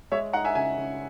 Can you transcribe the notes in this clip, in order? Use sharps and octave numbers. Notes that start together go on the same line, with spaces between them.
G#3 C#5 E5
D#4 F#5 A#5
E5 G#5
C#3 E5 G#5
C#3